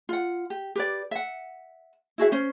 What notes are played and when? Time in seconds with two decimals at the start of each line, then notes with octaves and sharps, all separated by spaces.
0.09 F4 F#5
0.50 G4
0.75 G4 B4 D5
1.11 E5 F#5
2.18 E4 F#4 G#4 E5
2.32 C#4 C5